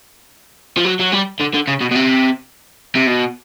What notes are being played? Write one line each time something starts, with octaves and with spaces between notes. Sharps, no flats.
F3
F#3
F#3
G3
D3
D3
C#3
B2
B2
C3
C3
B2